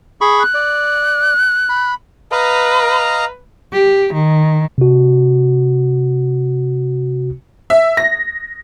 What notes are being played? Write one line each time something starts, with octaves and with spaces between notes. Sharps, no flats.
G#4 B5 C#6
F#6
D5
B5
B4 D#5 F5 A#5
G4
D#3
C3 F#4
E5
A#6